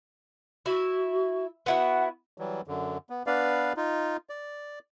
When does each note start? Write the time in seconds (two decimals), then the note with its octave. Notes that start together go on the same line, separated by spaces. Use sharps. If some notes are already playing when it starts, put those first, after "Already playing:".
0.66 E4 F#4
1.66 B3 E4 F#4 F#5
2.38 E3 F#3 G3
2.67 F#2 D3
3.10 B3
3.27 B3 D4 B4 D5 F5
3.77 D#4 F4
4.30 D5